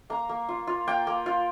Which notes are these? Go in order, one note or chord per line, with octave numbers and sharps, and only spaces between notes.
A#3 A#5
A#3
F4
F4
A#3 G5
A#3
F4